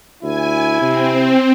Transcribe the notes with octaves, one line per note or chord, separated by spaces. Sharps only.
D2 E4 G#5
C3 C4